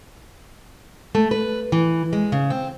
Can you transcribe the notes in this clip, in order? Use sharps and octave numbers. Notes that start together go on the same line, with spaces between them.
A3
B4
E3
G#3
C#3
C4